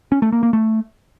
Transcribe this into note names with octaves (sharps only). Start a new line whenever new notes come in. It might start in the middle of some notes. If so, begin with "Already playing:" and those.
C#4
A3
A#3
A#3
A3